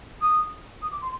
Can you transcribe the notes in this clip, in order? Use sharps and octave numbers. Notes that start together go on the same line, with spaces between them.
D#6
D#6
D6
C6